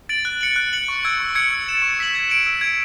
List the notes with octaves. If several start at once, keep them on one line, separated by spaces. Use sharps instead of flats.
A6 D7 F#7
F#6
C#7 F#7
F#6
C#7 F#7
C#6
E6 G#6 D7
C#6
E6 G#6 C#7
E6
A6 E7
C#6
E6 B6 F#7
G#6
D7 F#7
E6
G#6 D7